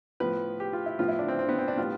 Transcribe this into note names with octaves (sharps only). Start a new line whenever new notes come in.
A2 F3 B3 B4
G4
F4
E4
A2 F3 B3 F4
E4
D4
C4
C4
B3
C4
D4
A2 G3 B3 F4